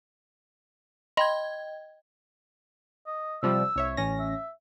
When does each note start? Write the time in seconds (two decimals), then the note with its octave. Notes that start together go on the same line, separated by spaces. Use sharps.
1.17 D#5 G5 B5 C6 G#6 A#6
3.06 D#5
3.43 C3 F3 G3 E6
3.76 C2 C#5 E5
3.97 A1 C#4 A#6
4.20 E5